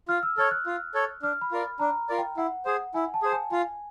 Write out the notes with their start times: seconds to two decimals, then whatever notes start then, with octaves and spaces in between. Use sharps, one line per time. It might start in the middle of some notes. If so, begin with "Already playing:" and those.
0.08 F4 F6
0.23 E6
0.37 A4 C#5 F6
0.51 F#6
0.66 F4
0.94 A4 C#5
1.22 D4 F6
1.41 B5
1.51 F4 A#4 D5
1.79 D4 A#5
2.09 F4 A#4 D5
2.18 G5
2.37 E4 F#5
2.65 G#4 C5 F#5
2.94 E4 G#5
3.14 A5
3.22 G#4 C5
3.32 G#5
3.51 F4 G#5